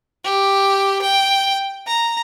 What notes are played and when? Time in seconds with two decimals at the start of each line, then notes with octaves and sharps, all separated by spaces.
0.24 G4
1.01 G5
1.87 A#5